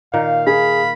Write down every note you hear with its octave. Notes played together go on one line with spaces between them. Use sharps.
A#2 D#3 A#3 F5
G#4 B5